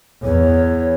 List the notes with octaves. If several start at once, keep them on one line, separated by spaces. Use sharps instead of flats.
E2 C#5